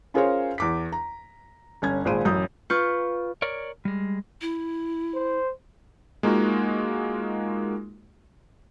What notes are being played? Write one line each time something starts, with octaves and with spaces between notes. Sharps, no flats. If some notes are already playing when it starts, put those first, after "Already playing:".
C#4 F4 G#4 A#4 C5 C#5
E2 D6 B6
A#5
G1 C#4 G#6
G#1 A#2 G#4 C5 D7 D#7
A1 F#2 D#6 G6
F4 B4 C#6 G6
A#4 C#5 D5
G3 G#3
E4
C5
G#3 A#3 D#4 F4 F#4